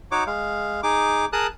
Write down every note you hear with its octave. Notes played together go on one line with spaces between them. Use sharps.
D#4 F#4 C#5 D6
G#3 F5
D#4 G#4 D6
G#4 A#4 A5 D#6 F#6